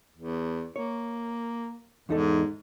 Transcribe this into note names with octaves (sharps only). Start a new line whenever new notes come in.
E2
A#3 C#5
E2 G#2 D#4 A4